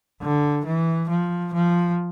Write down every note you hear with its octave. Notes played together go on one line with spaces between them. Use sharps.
D3
E3
F3
F3